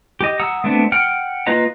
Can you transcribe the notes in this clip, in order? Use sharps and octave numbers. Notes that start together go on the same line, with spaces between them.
G4 D#5
F#5 A#5 D#6 E6
A3 B3 C4 D4
F#5 G5 F6
A#3 F4 B4 D#5 A#5